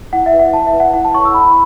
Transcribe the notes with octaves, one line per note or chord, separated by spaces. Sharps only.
E4 F#5
E5
B4
F#5
E4 A5
E5
B4
F#5
E4 F#5
A5
A4 C#5 C#6
E6
E4 B5